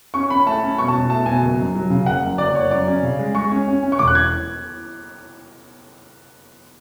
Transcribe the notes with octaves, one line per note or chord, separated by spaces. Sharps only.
C#4 C#6
C#4 B5
A3 A5
C#4
B2 C#6
A5
B2
A3 A5
B2 G#5
F#1
F#2
F#3
C#3
F#1 F#5
F#2
F#1 D5
F#1 C#5
F#2 D5
C#4
C#3
G#3
G#3 C#6
C#4
C#4
C#4
C#6
E1 D6
F#6
G#6